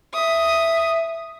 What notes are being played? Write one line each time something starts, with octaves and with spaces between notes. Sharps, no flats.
E5 D#6